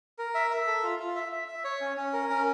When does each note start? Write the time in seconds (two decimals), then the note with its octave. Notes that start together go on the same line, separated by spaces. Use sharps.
0.18 A#4
0.35 E5
0.50 E5
0.67 A4
0.83 F4
0.99 F4
1.16 E5
1.32 E5
1.48 E5
1.64 C#5
1.81 C#4
1.97 C#4
2.13 A#4
2.30 C#4